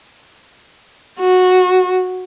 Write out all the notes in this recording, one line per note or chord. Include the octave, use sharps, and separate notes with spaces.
F#4